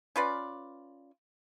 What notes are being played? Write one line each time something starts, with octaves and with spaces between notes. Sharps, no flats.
C#4 F4 B4 D5